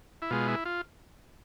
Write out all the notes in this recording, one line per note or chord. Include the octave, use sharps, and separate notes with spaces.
E4
B2 G#3 F4
E4
F4